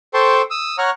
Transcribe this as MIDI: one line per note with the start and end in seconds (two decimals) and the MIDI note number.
0.14 0.42 69
0.14 0.42 72
0.14 0.42 79
0.14 0.42 81
0.14 0.42 84
0.14 0.42 85
0.51 0.76 87
0.51 0.76 88
0.78 0.90 73
0.78 0.90 78
0.78 0.90 82
0.78 0.90 85
0.78 0.90 89
0.78 0.90 90